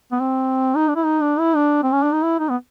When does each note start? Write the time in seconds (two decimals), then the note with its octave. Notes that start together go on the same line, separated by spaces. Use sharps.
0.12 B3
0.20 C4
0.76 D#4
0.88 D4
0.96 E4
1.05 D#4
1.22 D4
1.39 E4
1.56 D4
1.83 C4
1.92 C#4
2.03 D4
2.13 D#4
2.23 E4
2.39 D#4
2.49 B3